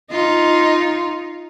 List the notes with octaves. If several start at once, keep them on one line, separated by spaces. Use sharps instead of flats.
D#4 F4